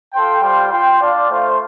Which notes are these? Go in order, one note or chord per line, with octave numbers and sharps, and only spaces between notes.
F4 A4 C5 G5
G3 F4 C5 G5
F4 C5 G5
D4 F4 D5 F5
A3 F4 C5 F5